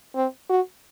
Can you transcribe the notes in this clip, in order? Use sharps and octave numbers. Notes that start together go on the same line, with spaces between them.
C4
F#4